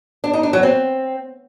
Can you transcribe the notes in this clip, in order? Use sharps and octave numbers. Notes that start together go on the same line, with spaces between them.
D4
D#4
D4
F#3
C4